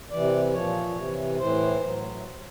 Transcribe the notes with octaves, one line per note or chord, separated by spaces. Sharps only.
C3 E3 D5
A#2 F3 C#5
C3 E3
A2 E3 C5
A2 F#3